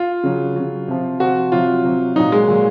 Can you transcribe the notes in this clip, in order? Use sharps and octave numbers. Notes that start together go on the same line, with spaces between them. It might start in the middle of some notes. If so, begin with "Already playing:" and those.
Already playing: F4
C#3 F#3
C#3 F#3
C3 F3
C3 F3 F#4
C3 F#3 F4
C3 F#3
A#2 F#3 D#4
G#3
A#2 F#3